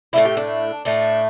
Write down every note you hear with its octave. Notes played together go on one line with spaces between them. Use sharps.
A2 A3 D4 E4
G4
D4
A2 A3 D4